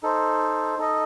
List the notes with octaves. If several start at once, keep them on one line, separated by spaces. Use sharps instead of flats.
D#4 A4 C5
D#4 A4 D#5